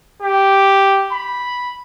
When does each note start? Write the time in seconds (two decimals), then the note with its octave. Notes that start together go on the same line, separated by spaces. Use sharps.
0.22 G4
1.12 B5